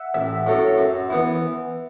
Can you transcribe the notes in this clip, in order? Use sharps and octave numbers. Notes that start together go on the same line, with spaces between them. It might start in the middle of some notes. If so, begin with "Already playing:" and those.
Already playing: E5 F#5
A1 E5
A2 F#3 A3 C#4
F#2
E3 B3 E4